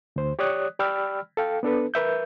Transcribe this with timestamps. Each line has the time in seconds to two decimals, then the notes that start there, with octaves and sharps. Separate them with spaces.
0.16 D2 C5
0.39 G4 C#5 D5 D#6 F#6
0.79 G4 D5 G5 B5 E6 F6
1.37 A4 F5 G5
1.63 B3 D4 A4 B4
1.94 A#4 B4 E5 G6